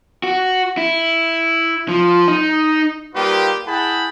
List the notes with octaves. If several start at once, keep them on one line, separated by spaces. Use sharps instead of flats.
F#4
E4
F3
D#4
G3 A#3 D#4 F4 G4 B4
E4 G#4 F#5 G5 A5 B5